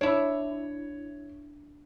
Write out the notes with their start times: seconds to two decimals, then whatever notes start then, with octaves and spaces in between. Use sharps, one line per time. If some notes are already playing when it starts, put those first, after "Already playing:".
0.01 D4 E4 C#5